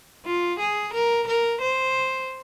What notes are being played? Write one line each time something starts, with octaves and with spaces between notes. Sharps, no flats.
F4
G#4
A#4
A#4
C5